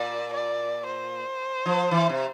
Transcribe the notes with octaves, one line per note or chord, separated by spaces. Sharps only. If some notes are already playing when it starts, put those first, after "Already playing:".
Already playing: A#2 D5
D5
C5
F3
E3
C3